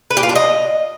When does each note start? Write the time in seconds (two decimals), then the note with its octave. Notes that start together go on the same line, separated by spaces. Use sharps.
0.11 B4
0.17 G4
0.23 F4
0.29 D4
0.35 D#5